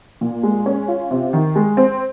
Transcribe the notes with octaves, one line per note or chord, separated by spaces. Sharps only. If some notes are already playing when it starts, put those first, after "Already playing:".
A#2
G#3
C#4
F4
C3
D#3
G#3
C4